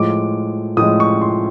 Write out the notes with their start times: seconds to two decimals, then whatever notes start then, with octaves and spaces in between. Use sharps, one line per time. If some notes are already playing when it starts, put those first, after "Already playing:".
Already playing: A2 F3 G#3 D6
0.77 A2 F3 G#3 D#6
1.00 C#6
1.22 C6